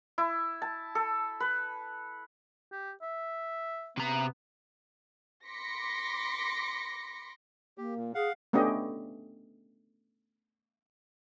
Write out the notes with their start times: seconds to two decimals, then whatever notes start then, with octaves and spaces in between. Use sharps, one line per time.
0.18 E4
0.62 A5
0.95 A4
1.40 B4
2.72 G4
3.02 E5
3.97 C3 B3 A#5
5.47 B5 C6 D6 A#6 B6 C#7
7.78 A#3 G4
7.97 A#2
8.15 G#4 F5 F#5
8.53 A3 B3 C#4 D4 G4 D#5